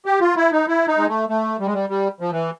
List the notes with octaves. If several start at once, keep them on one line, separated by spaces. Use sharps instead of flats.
G4
F4
E4
D#4
E4
D#4
G#3
A3
A3
G3
G#3
G3
G3
F3
E3